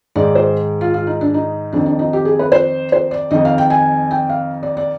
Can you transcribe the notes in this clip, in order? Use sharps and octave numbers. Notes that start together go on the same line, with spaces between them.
G#2 D#3 D5
C5
F4
F4
D#4
D4
D#4
F2 D#3 D4
D4
D#4
G4
G#4
B4
C5
C5
D5
F2 D#3 D#5
F5
G5
G#5
G5
F5
D5
D5